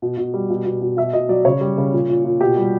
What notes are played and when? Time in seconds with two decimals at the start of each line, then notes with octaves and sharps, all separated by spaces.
0.02 B2
0.17 B2
0.34 G3
0.50 B2
0.65 B2
0.82 B2
0.97 B2 E5
1.13 B2 D#5
1.29 F#3 D5
1.45 C#3 C#5
1.61 G3
1.78 C#3
1.92 A#2
2.09 A#2
2.24 A#2
2.41 B2 G4
2.57 G3